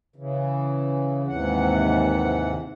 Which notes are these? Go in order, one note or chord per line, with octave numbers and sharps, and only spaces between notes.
C#3 E3
D#2 G#2 C3 E3 F#5